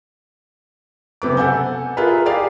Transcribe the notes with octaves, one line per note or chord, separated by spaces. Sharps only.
F#1 C3 B3 D6
A4 F#5 G#5 G6
E4 F4 G#4 A#4 B4
G4 G#4 A#4 D5 F5